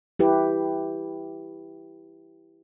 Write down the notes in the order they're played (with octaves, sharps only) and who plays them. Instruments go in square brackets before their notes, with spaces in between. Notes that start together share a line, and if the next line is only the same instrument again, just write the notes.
[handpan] E4 G4 B4